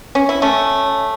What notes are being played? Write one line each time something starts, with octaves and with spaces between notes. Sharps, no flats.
C#4
E4
A3 C#4